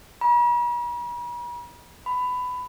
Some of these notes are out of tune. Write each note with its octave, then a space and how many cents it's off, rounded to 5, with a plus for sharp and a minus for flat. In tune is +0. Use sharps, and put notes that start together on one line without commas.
B5 -45
B5 +15